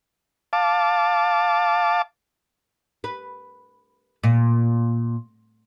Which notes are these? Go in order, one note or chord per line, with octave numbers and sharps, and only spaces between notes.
F5 A5 D6
B4
A#2